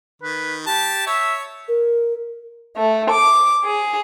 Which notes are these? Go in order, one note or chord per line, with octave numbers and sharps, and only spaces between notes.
D#3 B4
G4 A5
C#5 E5
A#4
A3
D6
G#4